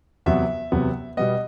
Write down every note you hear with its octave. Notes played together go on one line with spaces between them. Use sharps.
E2 C3 F#3 B3 E5
E2 C3 F#3 B3
B2 G3 B3 D#5